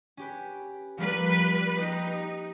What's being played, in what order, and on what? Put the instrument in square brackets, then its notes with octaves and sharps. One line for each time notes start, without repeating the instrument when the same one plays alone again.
[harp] C#4 G4 B4
[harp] F3 A#3 A#4 [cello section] G3 B4
[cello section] D#4 [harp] G4